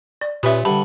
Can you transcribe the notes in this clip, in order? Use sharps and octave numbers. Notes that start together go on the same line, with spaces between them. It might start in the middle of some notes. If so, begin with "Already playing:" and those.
D5
A#2 C#4 G4 B4 E5
G2 D3 A5 B5